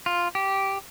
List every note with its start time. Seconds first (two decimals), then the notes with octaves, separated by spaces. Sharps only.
0.06 F4
0.35 G4